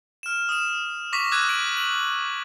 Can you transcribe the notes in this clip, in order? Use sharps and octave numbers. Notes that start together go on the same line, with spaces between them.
F6 E7
D#6 E7
C#6 D6 A#6 B6
D6 E6 F#6 G#6 A#6 D#7
D7 D#7 F#7
F#7